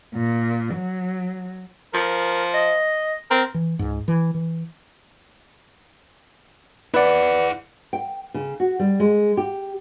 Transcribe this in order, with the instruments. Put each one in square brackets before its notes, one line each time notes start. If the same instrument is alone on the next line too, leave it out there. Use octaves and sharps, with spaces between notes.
[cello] A#2
F#3
[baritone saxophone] F3 [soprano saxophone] A#4
[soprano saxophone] D#5
[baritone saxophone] C4 [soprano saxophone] A#4
[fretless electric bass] E3
C#2 G#2
E3
E3
[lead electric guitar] E4 F#5 [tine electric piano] B4 D5
[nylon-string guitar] G5
C#3
F#4
G3
G#3
G4